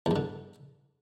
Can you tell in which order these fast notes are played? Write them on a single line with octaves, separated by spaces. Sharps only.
E2 G2 D3